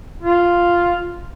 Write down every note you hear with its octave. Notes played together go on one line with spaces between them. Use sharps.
F4